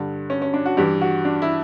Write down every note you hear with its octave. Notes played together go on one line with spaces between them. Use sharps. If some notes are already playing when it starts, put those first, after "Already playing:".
Already playing: G2 D3
C#4
C#4
D4
F#4
G2 E3 G4
F#4
D4
E4